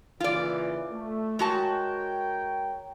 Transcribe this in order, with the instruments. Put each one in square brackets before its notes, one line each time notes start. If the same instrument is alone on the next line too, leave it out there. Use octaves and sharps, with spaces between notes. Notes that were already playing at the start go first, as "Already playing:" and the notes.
[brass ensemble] A#2 C#3 E3 [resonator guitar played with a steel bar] F4 D5
[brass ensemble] A3
[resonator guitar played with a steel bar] G#3 F#4 A5 [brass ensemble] A#4 C#5 G5